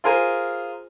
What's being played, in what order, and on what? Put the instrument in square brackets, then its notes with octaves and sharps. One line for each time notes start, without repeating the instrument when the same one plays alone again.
[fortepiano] F4 G#4 A#4 C5 G#5